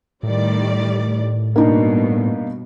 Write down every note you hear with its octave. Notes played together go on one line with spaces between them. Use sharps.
A2 D#3 G3 D5
G2 B2 A#3 D4 D#4